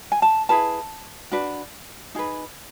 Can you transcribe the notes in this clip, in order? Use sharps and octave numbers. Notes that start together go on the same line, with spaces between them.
G#5
A5
E4 G#4 B4 A5
D4 F#4 B4
D#4 G#4 B4